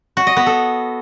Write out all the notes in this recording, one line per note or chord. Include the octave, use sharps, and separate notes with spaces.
F#4
D#5
B3
A4